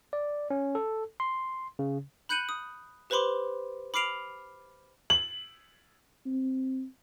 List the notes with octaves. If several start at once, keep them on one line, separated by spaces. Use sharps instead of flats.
D5
C#4
A4
C6
C#3
B5 F#6 G6 C#7 D#7 F#7
D#6
G4 B4 C5 B5 C6 D6
B5 D6 F6 C7 D7 F7
F#7
C4